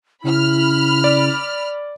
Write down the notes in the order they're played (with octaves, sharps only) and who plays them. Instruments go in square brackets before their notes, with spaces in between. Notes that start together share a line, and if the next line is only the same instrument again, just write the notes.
[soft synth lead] C#3 [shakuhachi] E4 [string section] B5 F6
[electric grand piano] D5